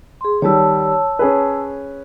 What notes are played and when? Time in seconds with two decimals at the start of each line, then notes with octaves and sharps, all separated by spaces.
0.21 G#4 C6
0.42 D#3 G3 C#5 A5 E6
1.19 C#4 G#4 B4